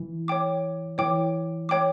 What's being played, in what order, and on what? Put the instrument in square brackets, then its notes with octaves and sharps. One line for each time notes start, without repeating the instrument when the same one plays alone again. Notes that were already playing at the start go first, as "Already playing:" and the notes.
Already playing: [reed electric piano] E3
[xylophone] C#5 G5 D6
[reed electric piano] E3 [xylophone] C#5 G5 D6
[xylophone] C#5 G5 D6